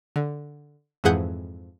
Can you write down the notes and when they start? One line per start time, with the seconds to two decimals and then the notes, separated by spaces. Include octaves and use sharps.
0.16 D3
1.04 F2 G#2 E3 G#4 F#5 G6